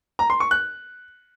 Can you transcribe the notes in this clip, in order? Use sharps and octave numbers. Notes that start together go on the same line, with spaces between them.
A#5
C6
C#6
F#6